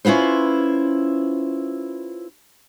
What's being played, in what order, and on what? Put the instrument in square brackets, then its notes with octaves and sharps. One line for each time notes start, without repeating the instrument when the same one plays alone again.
[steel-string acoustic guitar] C#4 E4 F4 B4 C5